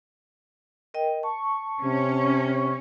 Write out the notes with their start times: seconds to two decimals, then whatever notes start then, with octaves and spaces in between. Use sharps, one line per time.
0.94 A#4 D#5 G5
1.23 A5 C#6
1.84 C3 C#4